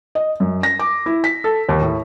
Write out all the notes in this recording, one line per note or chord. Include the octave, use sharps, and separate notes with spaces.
D#5
F#2
A#6
D6
E4
B6
A4
D#2
A2